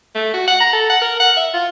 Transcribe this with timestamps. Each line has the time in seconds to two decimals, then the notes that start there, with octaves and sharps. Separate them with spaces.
0.15 A3
0.34 F#4
0.47 F#5
0.60 A#5
0.73 A4
0.90 F#5
1.01 A#4
1.20 F#5
1.37 E5
1.54 F4